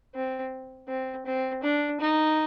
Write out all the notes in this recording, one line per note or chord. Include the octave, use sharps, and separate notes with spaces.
C4
C4
C4
D4
D#4